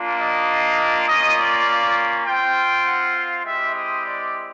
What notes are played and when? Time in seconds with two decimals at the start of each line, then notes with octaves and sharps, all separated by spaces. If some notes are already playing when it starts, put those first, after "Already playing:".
Already playing: A#3 D4 F4
0.19 D#5
1.07 A#3 C#4 F4 D#5
1.38 D5
2.26 C4 F4 G5
2.85 F#5
3.15 F5
3.45 G#3 C4 E4 G4 E5
3.74 D#5
4.04 D5